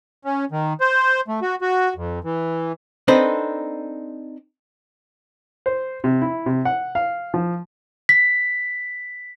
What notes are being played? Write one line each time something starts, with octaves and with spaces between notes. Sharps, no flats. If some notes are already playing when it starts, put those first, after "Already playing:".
C#4
D#3
C5
A3
F#4
F#4
F2
E3
C4 D4 D#4 A4 B4 C5
C5
C3
E4
C3
F#5
F5
F3
B6